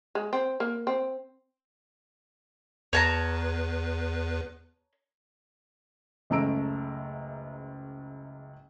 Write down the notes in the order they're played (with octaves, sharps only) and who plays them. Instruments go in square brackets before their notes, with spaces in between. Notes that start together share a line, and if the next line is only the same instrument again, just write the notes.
[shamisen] G#3
C4
A#3
C4
[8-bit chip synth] E2 B4 [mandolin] C#5 A5 A#5
[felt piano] F#1 C#2 A3 A#5 E6 D7